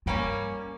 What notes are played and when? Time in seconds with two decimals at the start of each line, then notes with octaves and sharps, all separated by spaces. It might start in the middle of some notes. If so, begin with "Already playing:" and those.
0.06 G2 G3 A#3 C#4